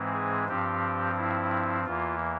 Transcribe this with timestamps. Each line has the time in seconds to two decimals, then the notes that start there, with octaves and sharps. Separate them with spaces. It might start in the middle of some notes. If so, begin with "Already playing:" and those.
Already playing: G#2 E3 G#3 C4
0.14 G#4
0.49 G2 F3 C4 G4
1.17 E4
1.86 E2 E3 A#3 F4